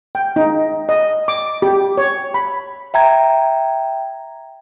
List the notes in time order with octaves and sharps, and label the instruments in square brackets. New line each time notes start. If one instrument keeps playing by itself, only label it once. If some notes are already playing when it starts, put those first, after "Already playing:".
[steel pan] G5
D#4
D#5
D6
G4
C#5
B5
[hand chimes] E5 G5 A#5 G#6